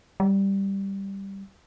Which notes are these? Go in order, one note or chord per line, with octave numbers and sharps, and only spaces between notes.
G3